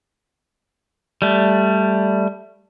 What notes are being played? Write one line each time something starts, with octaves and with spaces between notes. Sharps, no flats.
G3 A3